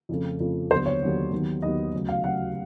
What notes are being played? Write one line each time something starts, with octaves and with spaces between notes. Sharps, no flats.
F2 C#3 F3 A3
F2 C#3 F3 A3
D#2 D3 F#3 B3 C5
C#5
D#2 D3 F#3 B3
D#2 D#3 F#3 B3
D#2 D#3 F#3 B3 D#5
D2 C#3 F#3
F5
D2 C#3 F#3 F#5